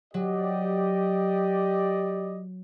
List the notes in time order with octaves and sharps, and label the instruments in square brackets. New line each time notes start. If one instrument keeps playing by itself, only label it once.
[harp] F#3 [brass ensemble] G4 D5 D#5